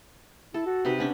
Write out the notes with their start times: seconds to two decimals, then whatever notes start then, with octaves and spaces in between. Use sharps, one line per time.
0.54 E4 A4
0.66 F#4
0.85 C3 D#4 B4
0.98 B3 C#4 D4